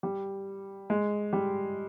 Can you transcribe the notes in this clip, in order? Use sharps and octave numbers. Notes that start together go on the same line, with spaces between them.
G3
G#3
G3